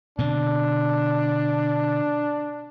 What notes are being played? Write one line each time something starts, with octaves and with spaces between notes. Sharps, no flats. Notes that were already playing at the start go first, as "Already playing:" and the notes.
B2 D3 C4 D4